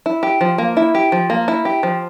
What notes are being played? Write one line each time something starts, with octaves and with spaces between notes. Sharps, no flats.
E4
G4
F3
A#3
E4
G4
F3
A#3
E4
G4
F3